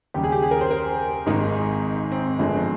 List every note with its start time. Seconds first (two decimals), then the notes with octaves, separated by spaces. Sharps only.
0.14 D#2 C#3 G3 G4
0.24 G#4
0.32 G4
0.42 G#4
0.51 A#4
0.61 C5
0.71 A#4
1.26 G#1 G#2 D#3 G#3 D#4
2.12 C4
2.39 G1 G2 F3 G#3